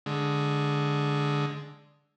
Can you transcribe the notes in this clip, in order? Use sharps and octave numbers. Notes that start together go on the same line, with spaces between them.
D3 G#3